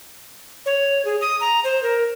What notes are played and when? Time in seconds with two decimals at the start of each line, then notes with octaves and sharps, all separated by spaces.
0.66 C#5
1.05 G#4
1.21 D#6
1.41 A#5
1.64 C5
1.83 A#4